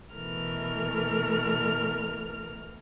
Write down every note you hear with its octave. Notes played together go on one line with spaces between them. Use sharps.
B2 E3 A3 A#4 F6